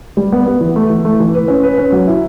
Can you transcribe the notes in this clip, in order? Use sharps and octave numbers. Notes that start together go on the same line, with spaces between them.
G3
B3
B3
E3
A3
E3
A3
E3
B4
C#4
B4
C#4
F#3
E4